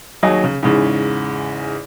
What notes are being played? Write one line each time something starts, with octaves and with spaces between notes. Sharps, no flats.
D#2 F#3 G#4 D#5
C#3
E2 G#2 C#3